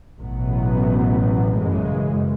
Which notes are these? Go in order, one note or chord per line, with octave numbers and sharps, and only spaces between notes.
A1 B2 F#3 B3
F#2 C#3 E3 G#3